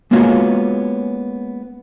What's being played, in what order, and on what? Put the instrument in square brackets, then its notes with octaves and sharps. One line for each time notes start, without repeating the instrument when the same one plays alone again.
[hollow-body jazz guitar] G#3 A#3 B3 C#4 F4 F#4